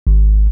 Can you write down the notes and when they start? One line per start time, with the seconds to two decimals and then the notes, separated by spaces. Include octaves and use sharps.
0.07 G#1